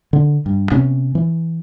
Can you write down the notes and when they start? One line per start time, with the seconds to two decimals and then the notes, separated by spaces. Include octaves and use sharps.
0.13 D3
0.46 G2
0.72 C3 B3 C#4
1.15 E3